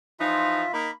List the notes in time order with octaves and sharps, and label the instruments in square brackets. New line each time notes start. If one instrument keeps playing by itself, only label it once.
[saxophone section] E3 F3 D#4 [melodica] F4 E5
[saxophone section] A#3 D#4 [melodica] B5